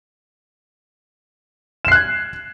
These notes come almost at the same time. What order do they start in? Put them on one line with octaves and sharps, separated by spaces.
E7 C7 F#6 G#6